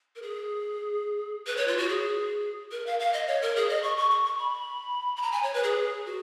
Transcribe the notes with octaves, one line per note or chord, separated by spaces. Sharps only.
A#4
G#4
B4
C#5
F4
F#4
G#4
A#4
F5
F5
D#5
C#5
A#4
G#4
D#5
C#6
C#6
C#6
C#6
B5
B5
A#5
G#5
C#5
B4
G#4
F#4